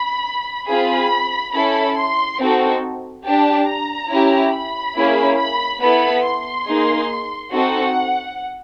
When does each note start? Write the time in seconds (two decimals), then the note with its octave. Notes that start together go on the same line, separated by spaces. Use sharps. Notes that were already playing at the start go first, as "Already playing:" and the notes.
Already playing: B5
0.69 C4 F4 G#4 B5
1.54 C#4 E4 A4 B5
1.97 C6
2.39 C4 D#4 F#4 A4
3.25 D4 G4 A5
3.67 A#5
4.11 C#4 E4 G4
4.53 B5
4.95 A#3 C#4 E4 G#4
5.38 B5
5.81 B3 E4 A4 B5
6.24 C6
6.67 A#3 D#4 G#4
7.52 C4 D#4 F#4 A4 F#5